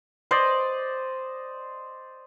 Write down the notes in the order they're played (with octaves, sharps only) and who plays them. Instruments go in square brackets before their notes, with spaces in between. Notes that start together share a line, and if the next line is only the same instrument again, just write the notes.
[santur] C5 D5 D#5